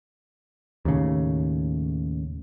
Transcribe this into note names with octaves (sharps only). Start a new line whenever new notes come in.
D#2 A2 C#3